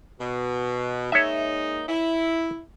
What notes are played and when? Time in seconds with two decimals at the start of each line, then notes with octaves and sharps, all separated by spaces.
0.20 B2
1.12 G#3 A#3 D#4 C#5 E5
1.89 E4